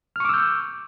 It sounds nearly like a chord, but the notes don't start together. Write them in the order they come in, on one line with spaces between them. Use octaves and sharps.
F6 C#6 D6 E6 G6